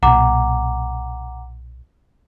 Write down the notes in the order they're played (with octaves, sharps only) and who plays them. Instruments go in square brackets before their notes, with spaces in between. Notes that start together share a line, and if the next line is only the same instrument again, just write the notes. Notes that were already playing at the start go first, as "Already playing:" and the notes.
[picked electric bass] B1 A#2 [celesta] F#5 A#5 D6